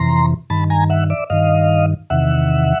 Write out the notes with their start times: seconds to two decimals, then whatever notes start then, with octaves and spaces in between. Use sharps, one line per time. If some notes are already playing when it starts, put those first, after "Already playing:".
Already playing: F2 C3 E3 A#5 C6
0.50 G2 D#3 A5 B5
0.70 G#5 A#5
0.90 E5 F#5
1.10 D5 E5
1.30 G2 D#3 D#5 F5
2.10 E2 C3 D#3 E5 F#5